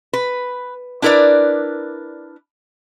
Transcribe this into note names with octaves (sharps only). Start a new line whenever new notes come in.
B4
D4 E4 A#4 B4 D5